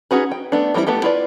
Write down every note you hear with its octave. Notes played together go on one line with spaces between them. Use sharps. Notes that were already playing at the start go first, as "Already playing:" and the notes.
C#4 D#4 F#4 G#4 B4
G5
A3 B3 D4
E3 G3 C4 D#4 E4
A3 B3 G4 A4
E4 F4 B4 D5